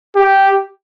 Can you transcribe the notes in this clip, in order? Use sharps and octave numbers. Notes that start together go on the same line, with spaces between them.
G4